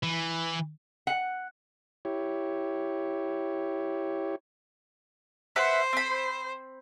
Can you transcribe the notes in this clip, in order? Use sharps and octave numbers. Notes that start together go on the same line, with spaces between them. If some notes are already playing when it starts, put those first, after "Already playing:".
E3
F#5
E4 G4 C#5
B4 C5 E5 F#5
C4 B5